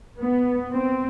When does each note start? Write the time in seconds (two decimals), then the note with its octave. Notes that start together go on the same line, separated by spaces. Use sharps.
0.20 B3
0.72 C4